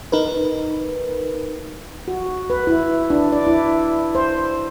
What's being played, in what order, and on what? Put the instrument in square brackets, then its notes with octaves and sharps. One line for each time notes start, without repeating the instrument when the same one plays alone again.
[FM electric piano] D#4 A#4 B4
[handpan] F#4
B4
E4
D4
D5
E4
C5